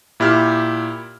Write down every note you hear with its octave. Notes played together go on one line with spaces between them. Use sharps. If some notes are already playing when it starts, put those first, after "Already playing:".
A#2 E4 G4 F6